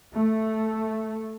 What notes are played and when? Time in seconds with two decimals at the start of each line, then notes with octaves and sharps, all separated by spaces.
0.14 A3